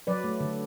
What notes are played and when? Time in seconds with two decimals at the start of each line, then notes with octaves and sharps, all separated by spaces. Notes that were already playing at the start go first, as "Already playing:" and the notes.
0.07 F#3 B4 D5
0.24 A3
0.40 D3